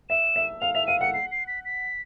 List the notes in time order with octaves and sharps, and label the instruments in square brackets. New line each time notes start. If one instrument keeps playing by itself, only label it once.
[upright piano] E5 [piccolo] E7
[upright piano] E5
[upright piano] F5 [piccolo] F7
[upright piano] E5 [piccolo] F7
[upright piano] F5 [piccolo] D#7
[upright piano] F#5 [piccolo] C#7
[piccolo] C7
C7
B6
B6